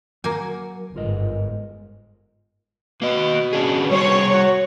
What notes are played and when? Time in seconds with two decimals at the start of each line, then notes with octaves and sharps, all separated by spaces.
0.24 F#3 A#3 F#4 G#5
0.96 G1 G#2 F4 A#4 D#5
3.02 B2 A#3 D#5
3.53 C#4 D4 G#4
3.91 G3 G#4 C5 C#5
4.34 F#4